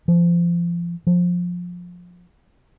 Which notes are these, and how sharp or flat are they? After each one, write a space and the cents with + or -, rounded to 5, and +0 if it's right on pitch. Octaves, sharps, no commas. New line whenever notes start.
F3 -25
F3 +20